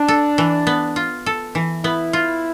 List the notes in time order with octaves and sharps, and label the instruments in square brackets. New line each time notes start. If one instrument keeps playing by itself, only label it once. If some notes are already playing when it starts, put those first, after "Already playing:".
Already playing: [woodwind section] D4
[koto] A4
E3
B3
F4
A4
E3
[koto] B3 [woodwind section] E4
[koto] F4